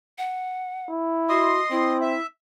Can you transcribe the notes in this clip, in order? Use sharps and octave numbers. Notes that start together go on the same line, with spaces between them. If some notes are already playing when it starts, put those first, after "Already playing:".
F#5
E4
F#4 D#5 C6 D#6
C4 E4
E5